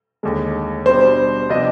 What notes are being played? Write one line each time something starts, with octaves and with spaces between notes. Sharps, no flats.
D#2 D3 G#3
B2 G3 D4 C5
C3 F3 B3 D4 D#5